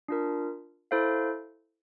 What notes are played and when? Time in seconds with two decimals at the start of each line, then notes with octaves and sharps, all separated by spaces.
0.08 D4 F4 A#4
0.91 E4 A4 C5 F5